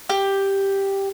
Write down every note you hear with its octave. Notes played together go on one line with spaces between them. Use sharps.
G4